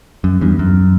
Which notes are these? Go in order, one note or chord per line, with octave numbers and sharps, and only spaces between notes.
F#2
E2 G2
F#2